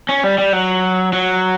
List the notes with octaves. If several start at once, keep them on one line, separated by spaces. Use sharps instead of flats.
C#4
G3
G3
F#3
F#3